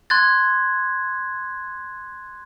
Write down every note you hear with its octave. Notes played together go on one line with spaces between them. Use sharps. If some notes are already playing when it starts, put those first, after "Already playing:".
C6 F#6 G#6 A6